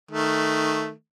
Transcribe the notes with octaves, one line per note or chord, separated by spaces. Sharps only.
D#3 A3